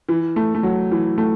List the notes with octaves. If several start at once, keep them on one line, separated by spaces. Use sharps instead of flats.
E3
A3
A3
F#3
E3
A3